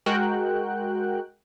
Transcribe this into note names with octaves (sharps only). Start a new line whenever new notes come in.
G#3 F#4 A#4 G5 F#6